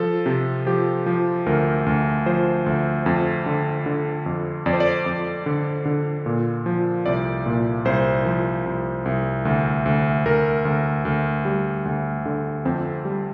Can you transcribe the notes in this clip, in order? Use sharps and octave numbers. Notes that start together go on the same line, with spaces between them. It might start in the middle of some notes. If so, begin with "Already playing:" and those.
Already playing: F3 A4
C3
F3 G4
F3
D2 A#4
D2
F3 C5
D2
F2
D3
D3
F2
F2 D5
C5
D5
F2
D3
D3
A#2
F3
C2 D5
A#2
C2 C5
F3
C2
C2
D2
D2
D2 A#4
D2
D2
G3
D2
D3
F2 C4
G3